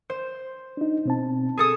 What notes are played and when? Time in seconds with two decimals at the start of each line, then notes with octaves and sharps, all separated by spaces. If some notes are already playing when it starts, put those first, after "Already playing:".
0.10 C5
0.77 D4 D#4
1.06 B2 C4 A5
1.57 G#4 A4 D#6